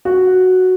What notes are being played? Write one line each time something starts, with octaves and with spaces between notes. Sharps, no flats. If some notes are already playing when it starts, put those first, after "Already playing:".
F#4